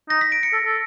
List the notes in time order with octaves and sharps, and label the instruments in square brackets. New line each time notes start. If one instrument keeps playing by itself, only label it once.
[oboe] D#4 [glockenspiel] A#6
[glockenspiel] B6
D7
C#7
[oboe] A4
A4